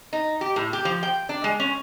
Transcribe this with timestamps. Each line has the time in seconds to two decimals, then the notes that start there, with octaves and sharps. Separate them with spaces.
0.13 D#4
0.41 G4
0.56 A2
0.73 G4
0.85 F3
1.03 G5
1.29 D4
1.44 G#3
1.60 C#4